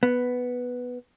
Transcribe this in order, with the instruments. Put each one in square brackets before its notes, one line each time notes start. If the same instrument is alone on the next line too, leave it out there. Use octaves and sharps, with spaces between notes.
[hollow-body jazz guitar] B3